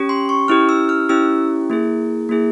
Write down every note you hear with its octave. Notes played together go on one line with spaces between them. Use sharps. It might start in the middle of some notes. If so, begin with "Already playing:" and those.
Already playing: C#4 G4
C6
C#6
C#4 E4 G4 F6
E6
F6
C#4 E4 G4 E6
A#3 E4 G#4
A#3 E4 G#4